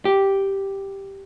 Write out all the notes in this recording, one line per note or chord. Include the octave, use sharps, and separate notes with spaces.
G4